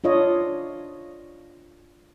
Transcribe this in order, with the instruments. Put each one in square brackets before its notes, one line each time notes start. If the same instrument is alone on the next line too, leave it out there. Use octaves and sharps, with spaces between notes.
[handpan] D4 F4 C#5 D#5